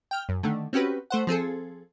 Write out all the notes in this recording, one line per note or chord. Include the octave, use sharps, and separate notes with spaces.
G5 F6
F#2
D3 D#3 A3
C4 C#4 F#4 G4 B4
A3 C5 F#5
F3 C4 G#4 A4